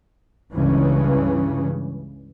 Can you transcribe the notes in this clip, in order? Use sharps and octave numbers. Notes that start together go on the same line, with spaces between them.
C#2 G2 C#3 E3 C#4